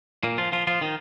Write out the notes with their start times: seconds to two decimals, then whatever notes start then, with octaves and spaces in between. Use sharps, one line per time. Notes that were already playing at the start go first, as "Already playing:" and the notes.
0.23 A#2 A#3
0.38 F3 F4
0.52 F3 F4
0.67 F3 F4
0.81 D#3 D#4